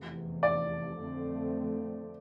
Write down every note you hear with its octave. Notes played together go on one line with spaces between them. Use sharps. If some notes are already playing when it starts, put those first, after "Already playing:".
Already playing: F1 E2 C3
D5
F2 D3 F3 A3 C4